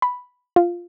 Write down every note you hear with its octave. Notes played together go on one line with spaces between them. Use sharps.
B5
F4